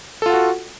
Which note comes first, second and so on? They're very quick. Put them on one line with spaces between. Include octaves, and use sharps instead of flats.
A4 F4 F#5 F#4